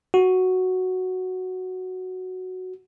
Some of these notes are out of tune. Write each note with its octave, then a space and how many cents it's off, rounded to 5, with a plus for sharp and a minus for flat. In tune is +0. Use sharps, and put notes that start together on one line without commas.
F#4 +0